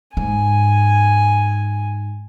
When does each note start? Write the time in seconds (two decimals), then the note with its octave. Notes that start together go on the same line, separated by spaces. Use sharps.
0.17 G#2 G#5